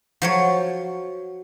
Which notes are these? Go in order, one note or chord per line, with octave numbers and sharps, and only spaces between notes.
F3 F#3 C#5